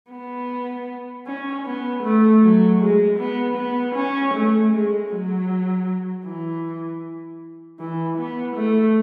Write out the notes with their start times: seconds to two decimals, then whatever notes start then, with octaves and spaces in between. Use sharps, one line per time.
0.11 B3
1.26 C#4
1.65 B3
2.03 A3
2.42 F#3
2.80 G#3
3.18 B3
3.57 B3
3.95 C#4
4.34 A3
4.72 G#3
5.11 F#3
6.26 E3
7.79 E3
8.18 B3
8.56 A3